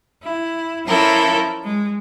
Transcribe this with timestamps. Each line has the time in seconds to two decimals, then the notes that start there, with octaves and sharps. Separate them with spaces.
0.23 E4
0.86 F3 C#4 E4 F4 A4 A#4
1.64 G#3